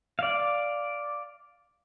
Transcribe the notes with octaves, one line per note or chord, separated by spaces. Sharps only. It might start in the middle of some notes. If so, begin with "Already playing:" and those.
D5 F5